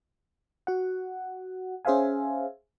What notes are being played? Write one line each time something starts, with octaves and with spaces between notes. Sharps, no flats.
F#4 F#5
C#4 G#4 C5 E5 F5 G#5